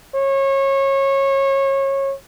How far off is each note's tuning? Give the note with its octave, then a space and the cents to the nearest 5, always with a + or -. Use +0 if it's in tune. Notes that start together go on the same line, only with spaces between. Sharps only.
C#5 -25